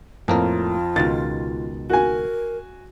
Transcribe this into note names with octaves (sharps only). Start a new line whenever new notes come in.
F2 A2 A#3 F4 A#4
C#2 B2 D#3 A6
F#4 A#4 G#5